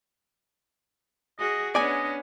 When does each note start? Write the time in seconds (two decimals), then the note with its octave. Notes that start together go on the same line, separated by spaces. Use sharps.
1.39 F#4 G#4 D#5
1.75 B3 C#4 D4 D5 D#5 G#5